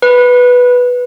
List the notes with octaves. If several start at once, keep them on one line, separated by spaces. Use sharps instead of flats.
B4